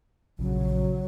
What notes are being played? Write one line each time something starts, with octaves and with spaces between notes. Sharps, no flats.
A#1 C#3 F#3